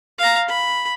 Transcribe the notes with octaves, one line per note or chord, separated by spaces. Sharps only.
F5 A#5
B5